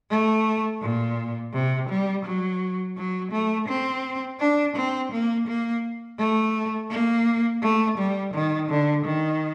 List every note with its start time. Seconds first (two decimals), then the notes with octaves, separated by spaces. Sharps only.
0.10 A3
0.82 A#2
1.53 C3
1.89 G3
2.25 F#3
2.97 F#3
3.32 A3
3.68 C4
4.40 D4
4.76 C4
5.12 A#3
5.47 A#3
6.19 A3
6.90 A#3
7.62 A3
7.98 G3
8.34 D#3
8.69 D3
9.05 D#3